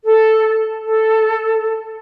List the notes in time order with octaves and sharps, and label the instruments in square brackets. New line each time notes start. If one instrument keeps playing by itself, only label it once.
[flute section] A4
A4